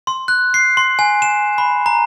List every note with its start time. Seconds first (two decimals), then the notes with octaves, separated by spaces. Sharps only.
0.07 C6
0.28 F#6
0.54 C7
0.77 C6
0.99 G#5
1.22 E7
1.58 B5
1.86 A#5